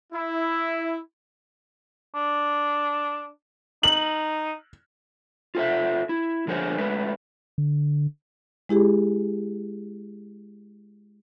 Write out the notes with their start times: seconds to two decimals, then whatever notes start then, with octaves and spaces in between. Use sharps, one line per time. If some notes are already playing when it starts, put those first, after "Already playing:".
0.13 E4
2.15 D4
3.83 D#4 F#7
5.55 F4 A4 C5 E5
6.09 E4
6.47 D3 F3 G#4 A#4 C5 C#5
6.78 G#3 A3 C#4 B4
7.58 D3
8.69 G#3 E4 G4 G#4